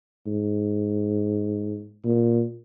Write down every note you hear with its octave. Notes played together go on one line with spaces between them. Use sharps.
G#2
A#2